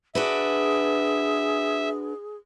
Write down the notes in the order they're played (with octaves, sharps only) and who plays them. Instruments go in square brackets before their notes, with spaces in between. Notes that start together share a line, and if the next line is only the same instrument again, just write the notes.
[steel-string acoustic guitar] D4 F#4 B4 [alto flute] G#4 [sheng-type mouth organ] E5